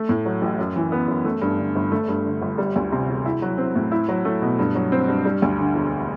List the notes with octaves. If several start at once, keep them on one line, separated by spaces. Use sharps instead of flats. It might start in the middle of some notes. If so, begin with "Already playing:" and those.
Already playing: A3
A2
F#3
A1
F#2
E3
B3
F#2
A3
G2
D3
G1
A3
G2
D3
G1
G3
D2
C3
E1
E4
F#3
C4
A2
E4
F#3
A3
B2
G2
F#3
C4
G2
G3
D2
D3
E1